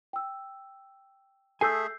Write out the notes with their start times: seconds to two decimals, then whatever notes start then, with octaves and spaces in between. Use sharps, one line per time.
0.13 G5 E6
1.61 A3 G#4 A4 E5 G#5 E6 G6 C7